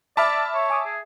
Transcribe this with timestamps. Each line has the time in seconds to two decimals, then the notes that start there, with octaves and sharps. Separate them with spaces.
0.17 D5 E5 A5 B5 D6 F6
0.54 C#5
0.70 G#5 D6 D#6
0.86 G#4